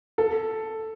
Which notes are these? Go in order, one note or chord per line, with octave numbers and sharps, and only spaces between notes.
A4